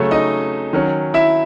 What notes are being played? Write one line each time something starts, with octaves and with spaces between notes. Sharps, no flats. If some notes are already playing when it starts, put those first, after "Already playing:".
Already playing: C#3 F#3 A3 C#4
D#4 D#5
D#3 F#3 C#4
E4 E5